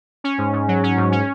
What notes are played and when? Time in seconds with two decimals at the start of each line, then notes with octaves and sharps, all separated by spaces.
0.24 C#4
0.38 G#2
0.53 G#2
0.68 F#3
0.83 C#4
0.97 G#2
1.12 C#4